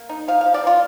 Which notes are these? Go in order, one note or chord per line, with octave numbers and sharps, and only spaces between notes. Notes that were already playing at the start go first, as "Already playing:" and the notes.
Already playing: A#3
D#4
F3 F5
F3 F5
D5
A#3 F4